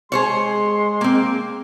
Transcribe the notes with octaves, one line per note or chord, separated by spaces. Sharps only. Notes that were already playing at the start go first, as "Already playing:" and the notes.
G#3 G#4 C5 C#5 C6
A#3 C4